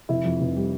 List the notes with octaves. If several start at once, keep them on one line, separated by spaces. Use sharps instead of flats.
F1 E4
F2
F1
G3